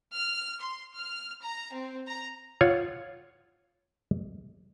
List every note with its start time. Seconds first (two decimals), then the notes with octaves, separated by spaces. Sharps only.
0.14 F6
0.60 C6
0.95 F6
1.42 A#5
1.73 C4
2.07 A#5
2.61 F4 C#5 F#5